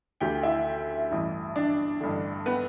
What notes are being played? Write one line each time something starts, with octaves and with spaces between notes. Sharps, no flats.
D2 D3 G4 G5
E4 E5
A1 G2 E3
D4 D5
A1 G2 D3
B3 B4